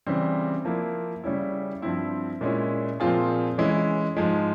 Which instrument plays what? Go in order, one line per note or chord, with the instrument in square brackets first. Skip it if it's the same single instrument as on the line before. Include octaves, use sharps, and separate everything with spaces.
[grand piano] C#3 E3 G3 C4
F3 A#3 E4
C#3 G3 C#4 E4
G2 F3 C4 E4
A#2 G#3 C#4 E4
A#2 F3 C4 F4 G#4
E3 G#3 C#4 E4
G#2 F3 G#3